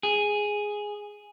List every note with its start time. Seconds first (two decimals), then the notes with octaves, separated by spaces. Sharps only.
0.03 G#4